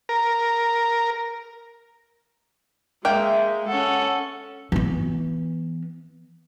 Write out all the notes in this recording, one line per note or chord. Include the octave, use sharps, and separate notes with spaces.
A#4
G#3 A#3 E5 G5
C#4 A4 F#5
E3 B3